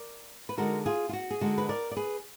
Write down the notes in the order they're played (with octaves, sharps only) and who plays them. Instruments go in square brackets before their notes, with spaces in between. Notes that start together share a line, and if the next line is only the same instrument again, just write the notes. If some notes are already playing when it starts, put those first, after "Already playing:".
Already playing: [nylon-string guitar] A#4 D5
B4
D3 G#3 D#4 F#4 A#4
F4 G#4
F4
F#4
G#4
D3 G#3 D#4 F#4
B4
A#4 D5
D5
G#4 B4